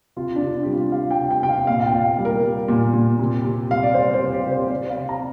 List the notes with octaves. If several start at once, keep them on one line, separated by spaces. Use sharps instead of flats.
C3 F4
D4
C3
F4
G3 G4
F4
G3 F5
G5
C3
G5
C3 G5
F5
A#2 F5
F5
G5
A#2
G3
A#4
G3
A#2
A#2
C3
C3
G3 F5
D5
G3 C5
C5
C3
G4
C3
C5
C3 D5
F5
C3
A#5